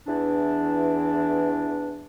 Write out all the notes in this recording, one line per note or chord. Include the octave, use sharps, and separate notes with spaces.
E2 E3 D4